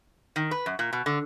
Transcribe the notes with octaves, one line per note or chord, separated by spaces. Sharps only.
D#3
B4
F#2
A#2
B2
D3